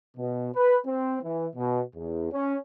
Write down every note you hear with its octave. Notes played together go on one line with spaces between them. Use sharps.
B2
B4
C4
E3
B2
E2
C#4